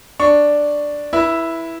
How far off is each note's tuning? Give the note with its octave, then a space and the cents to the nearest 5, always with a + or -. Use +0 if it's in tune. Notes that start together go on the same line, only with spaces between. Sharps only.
D4 +0 C#6 +0
E4 +0 B4 -35 E5 +0